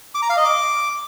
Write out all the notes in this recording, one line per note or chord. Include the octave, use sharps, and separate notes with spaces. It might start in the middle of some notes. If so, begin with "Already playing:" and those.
D6
A#5
F5
D#5
D6